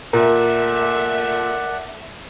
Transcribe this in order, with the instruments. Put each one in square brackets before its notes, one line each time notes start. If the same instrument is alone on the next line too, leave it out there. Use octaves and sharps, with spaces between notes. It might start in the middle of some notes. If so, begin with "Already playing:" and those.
[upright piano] A#2 [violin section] A3 E5 [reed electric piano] A#4 [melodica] D5 F#5